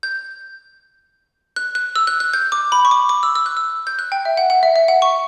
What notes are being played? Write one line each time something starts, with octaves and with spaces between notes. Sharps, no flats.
G6
F#6
F#6
E6
F#6
F#6
G6
D6
B5
C#6
D6
D6
E6
E6
F#6
E6
G6
F#6
G5
E5
F#5
F#5
E5
E5
F#5
C#6